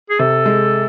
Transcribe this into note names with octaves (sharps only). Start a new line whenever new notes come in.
G#4
C3 A4
G#3